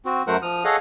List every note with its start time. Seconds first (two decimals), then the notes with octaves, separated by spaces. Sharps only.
0.05 C4 F#4
0.27 F#2 F#3 A3 A#4 C5 F#5
0.42 F3 D#6 F6
0.65 G#4 A4 C#5 D#5 F5 F#5